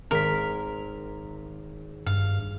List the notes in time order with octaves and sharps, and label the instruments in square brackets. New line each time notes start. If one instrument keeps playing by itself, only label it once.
[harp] G#1 B6 [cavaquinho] A#4
[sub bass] G2 [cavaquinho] F5